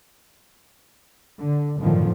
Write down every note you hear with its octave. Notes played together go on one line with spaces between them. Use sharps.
D3
G1 F#2 A2 D3 D#3 F3